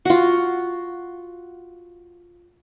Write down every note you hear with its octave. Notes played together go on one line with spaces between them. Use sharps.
F4 F#4